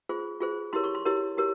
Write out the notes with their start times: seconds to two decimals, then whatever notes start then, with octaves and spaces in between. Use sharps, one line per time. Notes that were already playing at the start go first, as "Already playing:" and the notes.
0.09 F4 G#4 C5
0.40 F4 G#4 C5
0.73 E4 G4 A#4 C#5 C6
0.84 C#6
0.95 C6
1.05 E4 G4 A#4 C#5
1.37 E4 G4 A#4 C#5